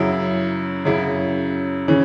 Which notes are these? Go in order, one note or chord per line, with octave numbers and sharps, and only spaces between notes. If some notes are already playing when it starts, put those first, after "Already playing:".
Already playing: F#2 C#3 F#3 E4 G#4
F#2 C#3 F#3 E4
C#3 E3 C#4